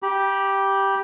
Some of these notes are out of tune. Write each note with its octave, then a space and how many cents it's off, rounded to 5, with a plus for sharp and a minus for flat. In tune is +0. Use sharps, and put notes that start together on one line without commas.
G4 +0 B5 -35